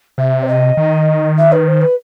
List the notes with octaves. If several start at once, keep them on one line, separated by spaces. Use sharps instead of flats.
C3 E5
C5
D#5
D#3
E5
B4
C5
B4